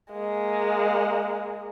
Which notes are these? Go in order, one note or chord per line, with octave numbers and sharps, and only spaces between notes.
G#3 A#3